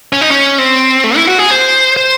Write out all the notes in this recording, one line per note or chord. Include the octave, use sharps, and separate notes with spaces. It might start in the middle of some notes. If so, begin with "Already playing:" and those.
C#4
D#4
C#4
C4
A3
E4
F#4
G#4
C5
C5